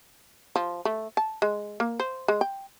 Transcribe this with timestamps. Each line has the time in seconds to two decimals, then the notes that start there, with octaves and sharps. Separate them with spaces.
0.56 F3
0.85 A3
1.17 A5
1.42 G#3
1.80 A#3
2.00 C5
2.28 G#3
2.41 G5